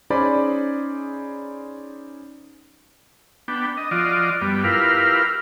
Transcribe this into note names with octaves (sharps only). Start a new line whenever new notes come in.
C#4 D#4 G#4 C5 D5 B5
B3 D4 G5
D#5
F3 F4 F#4 D5 D#5
G2 G3 B3
E4 F4 G4 A#4 B4 F5